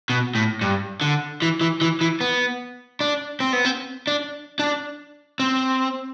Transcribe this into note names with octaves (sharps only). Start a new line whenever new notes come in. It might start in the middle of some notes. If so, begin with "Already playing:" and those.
B2
A2
G2
D3
E3
E3
E3
E3
B3
D4
C4
B3
C4
D4
D4
C4